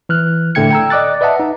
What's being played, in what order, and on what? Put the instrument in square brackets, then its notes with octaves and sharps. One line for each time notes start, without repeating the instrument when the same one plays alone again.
[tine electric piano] E3 F6 F#6
A2 D3 A3 G5 G#6 C#7
G5 A#5 E6
D5 D#5 D6 F#6 A6
B4 D#5 E5 F#5 A5
D#4